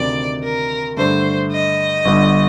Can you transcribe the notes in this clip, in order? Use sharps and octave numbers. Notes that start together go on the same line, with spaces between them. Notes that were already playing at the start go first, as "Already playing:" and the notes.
Already playing: D2 C3 D#3 D5
A#4
G2 D3 A3 C5
D#5
G1 G2 D3